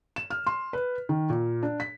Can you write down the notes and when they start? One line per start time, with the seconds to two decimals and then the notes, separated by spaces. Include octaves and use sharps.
0.16 E7
0.30 F6
0.47 C6
0.73 B4
1.09 D#3
1.30 A#2
1.63 D4
1.80 B6